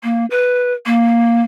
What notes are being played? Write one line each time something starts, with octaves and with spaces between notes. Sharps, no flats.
A#3
B4
A#3